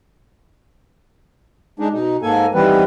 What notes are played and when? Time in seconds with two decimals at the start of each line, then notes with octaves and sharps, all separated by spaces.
1.80 G#3 D4 D#4
1.93 B2 D#4
2.22 G#2 A#3 A4 G#5
2.54 D#3 E3 G3 B3 C4 B4